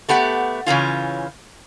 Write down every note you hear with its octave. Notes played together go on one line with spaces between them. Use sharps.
A3 B3 G4 F#5
C#3 E3 C#4 F4